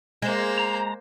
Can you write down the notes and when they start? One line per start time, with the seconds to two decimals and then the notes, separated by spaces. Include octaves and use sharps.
0.22 G#3 A#3 C5
0.58 A#5